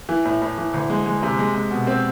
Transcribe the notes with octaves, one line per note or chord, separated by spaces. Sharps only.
E3
A2
A2
E3
D2
G#3
G#3
C3
G#3
G#3
B2
C4